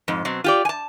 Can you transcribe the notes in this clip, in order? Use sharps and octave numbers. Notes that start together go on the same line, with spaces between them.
F2 G#2
B2 F#3 C4
F4 G4 D5
G#5 A5